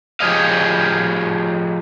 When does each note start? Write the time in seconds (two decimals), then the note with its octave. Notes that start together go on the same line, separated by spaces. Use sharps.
0.20 F3 G4 G#4 C#5 D#5 F5